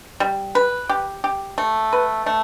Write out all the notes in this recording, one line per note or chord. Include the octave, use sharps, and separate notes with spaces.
G3
B4
G4
G4
A3
B4
A3